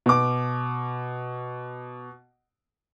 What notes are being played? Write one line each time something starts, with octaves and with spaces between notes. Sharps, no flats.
B2 D6